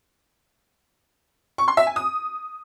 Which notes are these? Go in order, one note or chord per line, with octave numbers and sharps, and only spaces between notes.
C#6
C6
E5
G#5
D#6